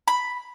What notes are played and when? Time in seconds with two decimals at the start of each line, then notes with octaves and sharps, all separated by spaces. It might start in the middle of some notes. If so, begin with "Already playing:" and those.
0.08 B5